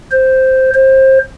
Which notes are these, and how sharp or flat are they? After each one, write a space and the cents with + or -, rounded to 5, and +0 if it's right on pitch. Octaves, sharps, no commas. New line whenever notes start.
C5 +0
C5 +25